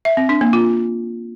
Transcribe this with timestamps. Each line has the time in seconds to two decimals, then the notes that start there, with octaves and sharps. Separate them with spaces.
0.05 E5
0.17 C4
0.29 D4
0.41 A#3
0.53 F4